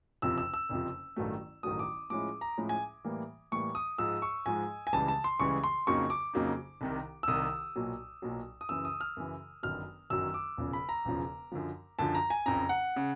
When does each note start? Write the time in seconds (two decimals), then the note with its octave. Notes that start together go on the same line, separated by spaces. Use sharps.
0.22 F#1 F2 C3 F3 E6
0.38 E6
0.54 E6
0.69 F#1 F2 C3 F3
1.16 A1 G2 D#3 F#3 A3
1.63 A1 G2 D#3 F#3 A3 D#6
1.79 D6
2.10 A2 F3 G#3 C#4 E4 D6
2.41 A#5
2.58 A2 F3 G#3 C#4 E4
2.69 G#5
3.04 A2 E3 G3 A#3
3.52 A2 E3 G3 A#3 C#6
3.75 D#6
3.98 G#2 F3 G#3 E6
4.22 C#6
4.46 G#2 F3 G#3 G#5
4.87 G#5
4.93 C#2 C#3 E3 G3 A5
5.08 A5
5.24 C6
5.40 C#2 C#3 E3 G3 C#6
5.64 C6
5.87 F2 C#3 F#3 A#3 D#4 C#6
6.10 D6
6.33 F2 C#3 F#3 A#3 D#4
6.81 C2 C3 D#3
7.23 E6
7.28 C2 C3 D#3 D#6
7.76 B1 A#2 F#3
8.22 B1 A#2 F#3
8.61 D#6
8.69 F#2 C#3 E3 E6
8.85 D#6
9.01 F6
9.17 F#2 C#3 E3
9.63 G1 F#2 D#3 F#3 F6
10.10 G1 F#2 D#3 F#3 E6
10.34 D6
10.57 E1 E2 C#3 F3
10.73 B5
10.89 A#5
11.05 E1 E2 C#3 F3
11.52 F#2 D3 F3
11.99 F#2 D3 F3 A5
12.15 A#5
12.30 G#5
12.46 F#1 F2 C#3 A#5
12.69 F#5
12.96 C#3